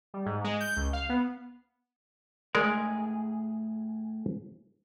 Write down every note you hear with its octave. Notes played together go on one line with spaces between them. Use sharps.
G3
G#2
G#3
G6
C#2
F5
B3
A2 G#3 G#4 A#4 D5